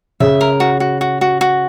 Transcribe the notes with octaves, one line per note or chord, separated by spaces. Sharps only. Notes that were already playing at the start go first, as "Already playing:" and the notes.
C#3 E5
A#4
F#4
F#4
F#4
F#4
F#4